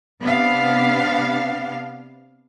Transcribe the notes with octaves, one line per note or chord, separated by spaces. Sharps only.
C3 B3 D4 F5